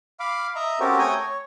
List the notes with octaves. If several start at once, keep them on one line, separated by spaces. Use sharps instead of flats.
F5 B5 D6
D#5 E5 A#5
C4 C#4 F#4 G4 A4 A#4
A3 C#5 G5 G#5 A#5 D#6
C#5